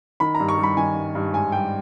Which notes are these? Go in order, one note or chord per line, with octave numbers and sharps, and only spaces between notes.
D#3 B5
A#5
G2
C#6
G3
B5
D#3 G#5
G2
G2
G#2 G#5
G3 G5